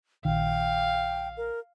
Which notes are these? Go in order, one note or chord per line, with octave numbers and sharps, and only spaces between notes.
A#1 D#3 F5 G5
A#4